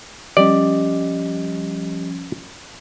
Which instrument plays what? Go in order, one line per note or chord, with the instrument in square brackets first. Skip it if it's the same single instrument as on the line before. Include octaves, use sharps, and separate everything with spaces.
[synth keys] F3 G3 C#4 [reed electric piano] G4 D#5 [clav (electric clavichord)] D5